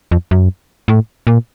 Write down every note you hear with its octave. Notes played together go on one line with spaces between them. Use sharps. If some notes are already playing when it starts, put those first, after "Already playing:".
F2
F#2
A2
A#2